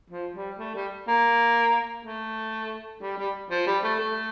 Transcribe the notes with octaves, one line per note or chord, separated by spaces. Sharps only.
F3
G3
A3
G3
A#3
A3
G3
G3
F3
G3
A3
A3